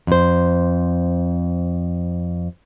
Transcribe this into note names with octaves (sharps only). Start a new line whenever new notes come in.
F2 C5